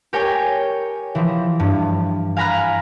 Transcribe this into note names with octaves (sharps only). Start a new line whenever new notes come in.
G4 A#4 C#5 G5 G#5
E3 F3
G2
F5 G#5 A#5 B5 F6 F#6